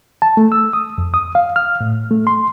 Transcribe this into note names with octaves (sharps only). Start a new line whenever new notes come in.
A5
A3
E6
D#6
F2
D#6
F5
F6
A2
A3
C6